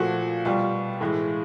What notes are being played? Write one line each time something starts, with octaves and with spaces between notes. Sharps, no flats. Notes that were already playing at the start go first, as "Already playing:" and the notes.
Already playing: A#2 F3 A3 F#4
B2 G3 F4
A2 E3 G#3